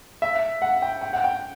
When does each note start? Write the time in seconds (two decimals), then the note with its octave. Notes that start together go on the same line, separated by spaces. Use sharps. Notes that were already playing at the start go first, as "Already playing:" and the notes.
0.22 E5
0.62 F#5
0.82 G5
1.01 G5
1.13 F#5
1.24 G5